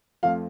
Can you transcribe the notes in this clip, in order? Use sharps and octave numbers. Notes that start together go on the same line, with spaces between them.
F2 F3 A3 F5